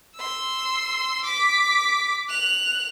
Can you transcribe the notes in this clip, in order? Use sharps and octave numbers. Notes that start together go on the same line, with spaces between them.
C6 E6
D6 B6
F#6 F7